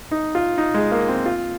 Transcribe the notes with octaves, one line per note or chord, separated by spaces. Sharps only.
D#4
F4
D#4
G#3
A#3
C4
F4